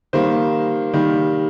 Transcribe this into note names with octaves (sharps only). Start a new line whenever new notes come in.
D#3 G3 A#3 C5
D#3 G3 A#3